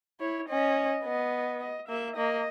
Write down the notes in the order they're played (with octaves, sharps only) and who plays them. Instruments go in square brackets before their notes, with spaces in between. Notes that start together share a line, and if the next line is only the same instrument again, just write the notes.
[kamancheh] E4 [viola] C#5
[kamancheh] C#4 [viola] D#5
[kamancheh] B3 [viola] D#5
[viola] D#5
[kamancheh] A#3 [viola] E5
[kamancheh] A#3 [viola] D#5